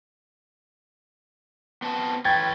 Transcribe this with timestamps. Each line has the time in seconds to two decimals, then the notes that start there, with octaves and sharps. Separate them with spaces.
1.82 B3 C4 A5
2.25 E3 B4 C#5 G5 G#6 A6